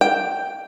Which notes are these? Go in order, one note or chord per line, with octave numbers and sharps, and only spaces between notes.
G5